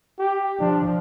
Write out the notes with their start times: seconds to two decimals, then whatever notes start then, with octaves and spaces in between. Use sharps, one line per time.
0.19 G4
0.59 F3 D4